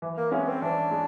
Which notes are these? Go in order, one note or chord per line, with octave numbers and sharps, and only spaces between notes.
E3
A#3
G#3 B3 C#4 E4
C4
E3 D4
G#3